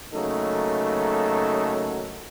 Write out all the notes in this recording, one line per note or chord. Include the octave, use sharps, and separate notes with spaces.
C#3 F#3 A3 A#3 D#4 A4